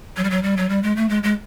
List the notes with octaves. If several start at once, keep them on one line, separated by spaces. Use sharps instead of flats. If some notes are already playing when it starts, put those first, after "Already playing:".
F#3
G3
F#3
G3
F#3
G3
G#3
A3
G#3
G#3